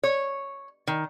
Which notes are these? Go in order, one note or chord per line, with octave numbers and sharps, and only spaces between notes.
C#5
D#3